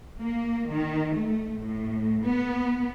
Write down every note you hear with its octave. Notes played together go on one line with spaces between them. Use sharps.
A#3
D#3
A3
A2
B3